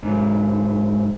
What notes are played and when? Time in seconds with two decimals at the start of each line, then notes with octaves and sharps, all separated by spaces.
0.03 G#2 F#3